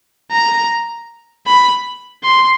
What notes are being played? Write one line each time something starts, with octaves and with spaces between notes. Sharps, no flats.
A#5
B5
C6